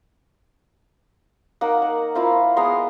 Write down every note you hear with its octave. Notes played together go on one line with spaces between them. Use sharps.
A#3 D#4 A#4 F#5
F#5
E4 F4 A#4 C5
G#3 B3 A#5 C6